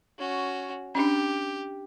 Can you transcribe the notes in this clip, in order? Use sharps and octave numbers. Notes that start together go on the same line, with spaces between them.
C#4 F#4
C#4 D4 G4